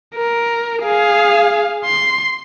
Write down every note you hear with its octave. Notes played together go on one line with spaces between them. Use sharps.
A#4
G#4 F5
C6